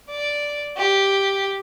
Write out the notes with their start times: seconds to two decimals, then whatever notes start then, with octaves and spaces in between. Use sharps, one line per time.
0.10 D5
0.77 G4